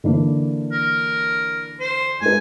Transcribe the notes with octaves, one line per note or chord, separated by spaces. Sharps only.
D3 E3 A#3
A#4
C5
G#3 A#4 G#5